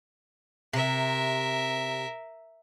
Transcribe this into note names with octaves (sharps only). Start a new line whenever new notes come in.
C3 A#4 E5